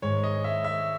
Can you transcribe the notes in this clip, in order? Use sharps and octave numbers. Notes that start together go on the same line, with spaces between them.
G#2 D#3 G#3 C#5
D#5
E5
E5